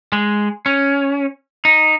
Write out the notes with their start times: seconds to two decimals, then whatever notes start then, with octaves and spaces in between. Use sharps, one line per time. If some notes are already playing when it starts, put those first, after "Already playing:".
0.13 G#3
0.66 C#4
1.65 D#4